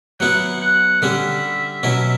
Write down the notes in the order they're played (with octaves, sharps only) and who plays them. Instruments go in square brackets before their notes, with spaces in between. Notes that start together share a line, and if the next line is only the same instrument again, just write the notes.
[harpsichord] F#3 B3 E4 [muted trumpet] F#5
[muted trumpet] F#5
[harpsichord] D3 G3 C#4 [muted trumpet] E5
[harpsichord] B2 F#3 C#4 E4